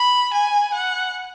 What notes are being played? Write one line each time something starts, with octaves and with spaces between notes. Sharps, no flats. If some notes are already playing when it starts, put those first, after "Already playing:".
Already playing: B5
G#5
F#5